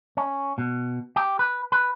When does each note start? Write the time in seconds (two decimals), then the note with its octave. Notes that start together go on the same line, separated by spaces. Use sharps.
0.17 C#4
0.58 B2
1.16 G4
1.39 B4
1.72 B4